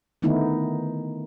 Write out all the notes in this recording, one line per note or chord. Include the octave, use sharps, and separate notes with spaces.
D3 D#3 A3 B3 D#4 E4